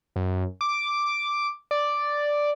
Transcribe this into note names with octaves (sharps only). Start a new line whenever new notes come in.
F#2
D6
D5